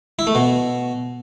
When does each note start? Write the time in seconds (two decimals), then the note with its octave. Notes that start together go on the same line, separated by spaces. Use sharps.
0.19 E4
0.27 A3
0.35 B2